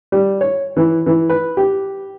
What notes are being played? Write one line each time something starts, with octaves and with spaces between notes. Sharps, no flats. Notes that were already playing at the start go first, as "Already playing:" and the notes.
G3
C#5
E3
E3
B4
G4